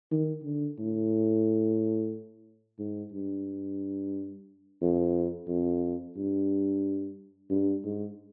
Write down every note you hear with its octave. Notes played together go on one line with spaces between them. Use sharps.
D#3
D3
A2
G#2
G2
F2
F2
G2
G2
G#2